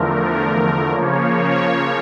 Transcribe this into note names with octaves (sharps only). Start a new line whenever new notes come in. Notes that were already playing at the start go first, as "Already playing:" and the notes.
Already playing: E2 D3 F3 A3 A#4
A#4
C#3 F3 A#3 C#5
C#5